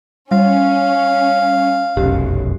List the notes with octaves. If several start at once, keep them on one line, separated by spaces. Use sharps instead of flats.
G3 C#4 F5
F1 B1 F#2 G4